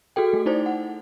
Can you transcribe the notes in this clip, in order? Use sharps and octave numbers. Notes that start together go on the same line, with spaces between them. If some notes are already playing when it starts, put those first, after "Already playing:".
F#4 G#4 A4 G5
A3
D#4 E4 C5 D5
F#5